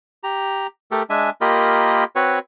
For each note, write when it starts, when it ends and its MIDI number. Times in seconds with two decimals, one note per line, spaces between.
0.24 0.67 67
0.24 0.67 82
0.91 1.03 57
0.91 1.03 67
0.91 1.03 69
0.91 1.03 70
1.10 1.30 56
1.10 1.30 62
1.10 1.30 76
1.10 1.30 80
1.41 2.04 58
1.41 2.04 65
1.41 2.04 67
1.41 2.04 70
1.41 2.04 75
1.41 2.04 83
2.16 2.39 60
2.16 2.39 66
2.16 2.39 71
2.16 2.39 73